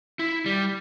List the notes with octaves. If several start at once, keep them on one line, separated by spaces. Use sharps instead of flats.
E4
G3